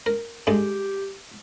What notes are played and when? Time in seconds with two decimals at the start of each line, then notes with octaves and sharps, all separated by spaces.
0.06 A#4
0.47 G2 G#3 G4 A4